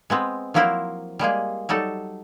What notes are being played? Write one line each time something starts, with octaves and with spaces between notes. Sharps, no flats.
G#3 B3 C4
F3 F#3 A#3 E4 A#4 C5
G3 G#3 A#3 G#4
F#3 G3 D#4 A4